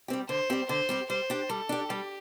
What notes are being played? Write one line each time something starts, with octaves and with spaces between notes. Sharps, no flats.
G3 C4 G4
D3 C5
G3 C4 G4
D3 C5
G3 C4 G4
G3 C5
D4 G4
G3 A4
D4 G4
G3 G4